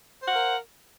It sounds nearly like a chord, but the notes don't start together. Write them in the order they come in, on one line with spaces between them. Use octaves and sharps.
C5 F#5 F5 A#4